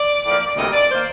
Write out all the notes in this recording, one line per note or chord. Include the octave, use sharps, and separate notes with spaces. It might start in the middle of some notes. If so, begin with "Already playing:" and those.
Already playing: D5
A2 F3 A#3
D2 C3 G3 A#3 D#5
D5
D#3 A#3 C5